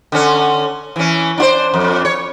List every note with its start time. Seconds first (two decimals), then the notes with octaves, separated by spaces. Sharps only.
0.12 D3 C#4
0.96 E3 C#4
1.38 D4 F4 C5
1.74 F2
2.05 C#5